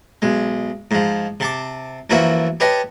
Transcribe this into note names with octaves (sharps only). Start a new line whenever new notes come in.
B1 G#3
G#2 F3
C3 A5 D6
F#2 E3 F3 A#3 F#4 E5
G4 B4 C#5 D#5 G5 A5